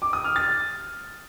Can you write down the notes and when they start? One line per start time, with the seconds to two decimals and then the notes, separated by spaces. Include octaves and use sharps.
0.02 D6
0.13 D#6
0.24 F6
0.36 A6